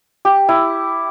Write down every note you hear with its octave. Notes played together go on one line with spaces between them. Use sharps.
G4
E4